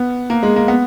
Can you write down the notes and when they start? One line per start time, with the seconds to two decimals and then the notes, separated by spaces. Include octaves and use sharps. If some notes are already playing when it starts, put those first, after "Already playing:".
Already playing: B3
0.30 A#3
0.43 G#3
0.56 A#3
0.68 B3